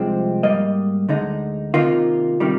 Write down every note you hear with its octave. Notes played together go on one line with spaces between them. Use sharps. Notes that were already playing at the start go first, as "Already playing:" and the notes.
Already playing: C2 C3 F3 G#3 C4
G#2 G3 A#3 D#5
D2 D3 G#3 D#4
C3 D#3 A#3 D#4 F4
C3 D#3 G3